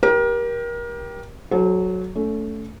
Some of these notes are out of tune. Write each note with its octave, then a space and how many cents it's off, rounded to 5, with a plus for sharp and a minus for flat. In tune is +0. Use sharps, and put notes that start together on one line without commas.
G4 +0 A#4 +30
F#3 +0 A4 -40 C5 +20
A3 +0 C#4 +35